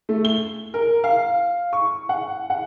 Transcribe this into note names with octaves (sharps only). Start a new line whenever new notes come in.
A3
G7
A#4
F5
C#6
F#5
F#5